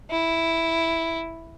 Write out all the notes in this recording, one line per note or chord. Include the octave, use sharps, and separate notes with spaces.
E4